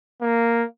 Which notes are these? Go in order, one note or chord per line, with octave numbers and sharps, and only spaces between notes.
A#3